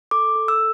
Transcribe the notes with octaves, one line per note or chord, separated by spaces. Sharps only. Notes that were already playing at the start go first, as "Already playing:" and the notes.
A4 D6
A4
E6